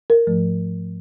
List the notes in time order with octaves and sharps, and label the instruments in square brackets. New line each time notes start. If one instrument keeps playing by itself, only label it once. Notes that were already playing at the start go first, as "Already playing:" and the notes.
[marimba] A#4
G#2 F3 A3